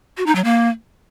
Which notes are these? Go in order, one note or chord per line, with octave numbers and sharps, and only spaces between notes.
F#4
D#4
F#3
A#3